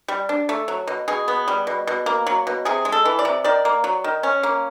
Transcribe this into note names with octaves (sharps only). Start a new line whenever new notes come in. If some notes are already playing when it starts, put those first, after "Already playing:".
G3
D4
A3
F#3
B2
B2 G#4
B3
G3
B2
B2
A#3
F#3
B2
C3 G#4
G#3
A4
E3
D5
C3
D#3 D5
A#3
F#3
D#3
C#4
A#3